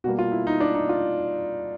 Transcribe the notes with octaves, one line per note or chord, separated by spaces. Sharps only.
B2 G3 A#3 F#4
F4
E4
D#4
D4
D#4
F4